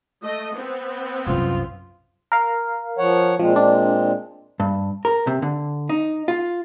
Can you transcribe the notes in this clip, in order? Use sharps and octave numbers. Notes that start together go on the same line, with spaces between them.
A3 D#5
B3 C4
C2 F#2 F4
A#4 F5
F3 C#5 F#5
A#2 F3 G#3 C4
D4
G2
A#4
C3
D3
D#4
F4